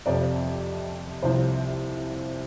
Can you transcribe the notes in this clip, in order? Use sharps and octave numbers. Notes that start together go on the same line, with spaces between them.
F2 C3 F3 D5
C2 C3 F3 C5